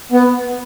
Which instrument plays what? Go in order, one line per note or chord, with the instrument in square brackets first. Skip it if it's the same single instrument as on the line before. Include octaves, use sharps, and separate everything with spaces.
[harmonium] B3